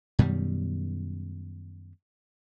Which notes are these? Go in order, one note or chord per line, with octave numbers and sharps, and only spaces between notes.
F#2 B2 D#3 G3